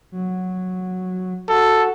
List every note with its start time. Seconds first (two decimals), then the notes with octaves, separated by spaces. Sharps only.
0.12 F#3
1.49 F#4 A4